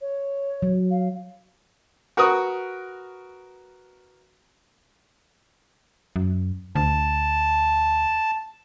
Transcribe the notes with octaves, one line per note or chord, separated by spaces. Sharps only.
C#5
F#3
F5
F#4 A#4 B4 C#6 D#6
F#2
D2 A5